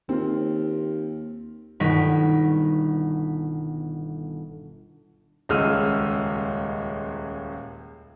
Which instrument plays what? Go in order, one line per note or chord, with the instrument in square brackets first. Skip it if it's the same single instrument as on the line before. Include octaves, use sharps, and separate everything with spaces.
[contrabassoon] D#2 [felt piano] C4 F4
[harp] G1 B2 D#3 B6
[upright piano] D#1 C#2 G#3 E6 F6 D#7